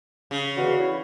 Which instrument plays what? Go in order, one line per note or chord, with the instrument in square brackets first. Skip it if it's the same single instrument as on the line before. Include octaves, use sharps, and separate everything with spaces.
[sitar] C#3
[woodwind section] E2 D3 E3 [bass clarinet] F#4
[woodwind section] C#3 E4